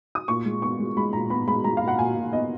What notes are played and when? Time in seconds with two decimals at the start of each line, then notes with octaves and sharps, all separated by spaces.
0.15 D#6
0.28 A#2 C#6
0.45 G#3
0.62 B3 C#6
0.79 G#3
0.96 G#3 B5
1.13 A#2 A#5
1.30 B3 B5
1.47 G#3 B5
1.64 G#3 A#5
1.77 A#2 F5
1.88 F#5
1.99 A#2 G#5
2.15 A#2
2.32 B3 D#5